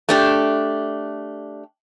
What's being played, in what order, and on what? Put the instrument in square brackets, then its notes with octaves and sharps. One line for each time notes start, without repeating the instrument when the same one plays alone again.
[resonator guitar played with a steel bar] A3 D4 G4